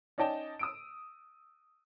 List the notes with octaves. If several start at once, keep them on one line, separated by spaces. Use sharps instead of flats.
C#4 D#4 D5 D#5 G5 A5
D#6 E6 D7